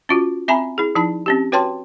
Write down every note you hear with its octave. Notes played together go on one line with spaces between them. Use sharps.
C#4 F4 F#4
C4 E5 G#5 A#5 B5
E4 G#4
F3 D#4 E4 A5
C4 C#4 G4
F#4 B4 C#5 G5 A5 C6